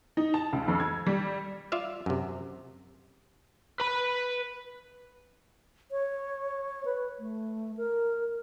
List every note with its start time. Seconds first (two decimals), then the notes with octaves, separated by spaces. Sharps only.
0.17 D#4
0.34 A5
0.53 C#2
0.68 F2
0.80 G#6
1.07 G3
1.72 F4 D5 E5 F5
2.06 F#2 C3
3.80 B4 B5
5.92 C#5
6.85 B4
7.19 A3
7.77 A#4